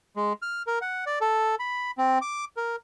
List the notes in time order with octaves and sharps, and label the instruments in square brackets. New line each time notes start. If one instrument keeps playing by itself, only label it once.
[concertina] G#3
F6
A#4
F#5
D5
A4
B5
C4
D6
A#4